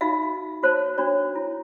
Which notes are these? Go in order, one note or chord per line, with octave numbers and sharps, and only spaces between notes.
D#4 F4 F#4 E5 F5
F#4 C5 C#5 A5
D4 F#4 C#5
E4